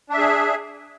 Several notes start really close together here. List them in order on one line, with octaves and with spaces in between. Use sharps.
D4 E5 G#4